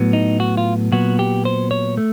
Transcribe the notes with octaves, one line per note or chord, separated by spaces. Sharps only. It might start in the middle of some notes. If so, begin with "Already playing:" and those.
Already playing: A2 F#3 B3
D#4
F#4
F4
A#2 F#3 B3 F#4
G4
C5
C#5
A3